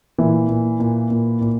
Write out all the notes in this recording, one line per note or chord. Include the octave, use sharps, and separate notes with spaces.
A#2 E3
A#2
A#2
A#2
A#2